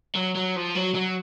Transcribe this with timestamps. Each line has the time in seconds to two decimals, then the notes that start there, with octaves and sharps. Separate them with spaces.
0.15 F#3
0.35 F#3
0.56 F3
0.75 F#3
0.95 F#3